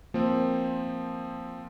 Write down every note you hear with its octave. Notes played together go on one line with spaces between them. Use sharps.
F3 A#3 C4